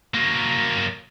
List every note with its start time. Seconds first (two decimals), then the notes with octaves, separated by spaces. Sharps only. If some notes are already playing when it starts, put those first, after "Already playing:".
0.14 F#3 A#3